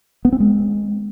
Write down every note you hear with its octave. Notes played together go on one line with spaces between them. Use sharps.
B3
C4
G#3